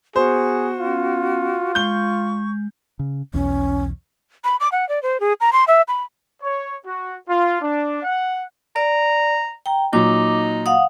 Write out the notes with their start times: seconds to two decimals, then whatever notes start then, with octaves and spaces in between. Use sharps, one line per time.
0.16 B3 F#4 G#4 C5
0.81 B3 C#4 F4
1.75 G#3 C#6 G6 G7
2.99 C#3
3.34 B1 E2 C#4
4.44 B5
4.60 D6
4.72 F#5
4.89 D5
5.03 C5
5.20 G#4
5.41 A#5
5.53 C6
5.68 E5
5.88 B5
6.42 C#5
6.85 F#4
7.27 F4
7.61 D4
8.03 F#5
8.76 D5 A#5
9.66 G5 A#5
9.93 A#2 F#3 D#4 D6
10.66 F5 F#5 D#6